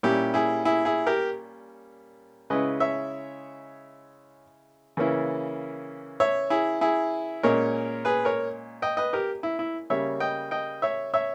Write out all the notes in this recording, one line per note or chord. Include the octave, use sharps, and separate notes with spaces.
A#2 G3 C#4 E4 G4
E4 G#4
E4 G#4
E4 G#4
G4 A#4
C#3 G#3 C#4 E4 B4 D#5
C#5 E5
C#3 E3 A#3 C#4 E4
C#5 E5
E4 G#4
E4 G#4
A#2 G#3 C#4 A#4 C#5
G#4 B4
A#4 C#5
D#5 G5
B4 D#5
G4 A#4
E4
E4
C#3 G3 A#3 C#5 E5
D#5 G5
D#5 G5
C#5 E5
C#5 E5